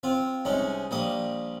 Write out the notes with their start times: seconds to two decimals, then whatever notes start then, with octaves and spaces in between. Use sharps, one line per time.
0.03 C4 F4
0.45 C2 G#3 C#4 D#4
0.91 A#1 G3 A#3 D#6